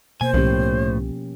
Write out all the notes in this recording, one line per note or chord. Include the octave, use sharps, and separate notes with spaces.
B2 A#3 C5 G#5
C2 A2 F3 C#4 G4